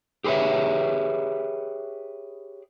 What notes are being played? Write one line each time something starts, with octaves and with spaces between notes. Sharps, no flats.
G4 G#4 B4 C#5 E5